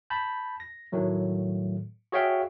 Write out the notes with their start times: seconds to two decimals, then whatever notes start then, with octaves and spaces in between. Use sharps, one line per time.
0.10 A5 B5 G6
0.60 A#6
0.92 A2 D#3 F#3 A3
2.12 F#4 G#4 C#5 E5 F5 G5